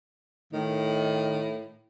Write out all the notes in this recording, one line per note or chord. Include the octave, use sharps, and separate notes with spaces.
A2 D#3